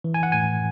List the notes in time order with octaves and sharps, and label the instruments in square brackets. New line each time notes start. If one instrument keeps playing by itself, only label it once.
[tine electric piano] E3
G#5
F#5
A2 G#5